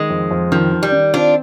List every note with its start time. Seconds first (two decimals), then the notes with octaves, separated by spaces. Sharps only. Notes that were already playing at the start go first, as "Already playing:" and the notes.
Already playing: D#3 G#3
0.10 F2
0.31 F2
0.52 D#3 F3
0.72 D#3
0.83 G3
0.92 D#3
1.13 C4 D4 F4